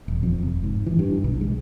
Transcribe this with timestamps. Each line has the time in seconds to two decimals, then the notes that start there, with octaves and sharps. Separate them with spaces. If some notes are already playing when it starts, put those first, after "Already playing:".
0.08 D#1
0.23 F2
0.43 F1
0.64 G#2
0.86 E3
0.99 G2
1.24 B1
1.41 G#3